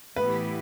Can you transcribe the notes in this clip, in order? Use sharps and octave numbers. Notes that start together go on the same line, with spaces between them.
A2 E3 B3 E4 G4 B4